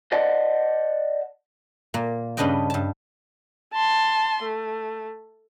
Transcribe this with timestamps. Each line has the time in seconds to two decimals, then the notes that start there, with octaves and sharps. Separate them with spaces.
0.12 C5 D5 D#5 F#5 A5
1.94 A#2 A#3
2.37 G2 C#3 D4 B4 D#5 G5
2.70 G2 A5
3.73 A5 C6
4.43 A3